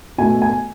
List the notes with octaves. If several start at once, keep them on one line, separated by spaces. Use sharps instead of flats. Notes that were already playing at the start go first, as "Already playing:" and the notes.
B2 A3 G#5
G#5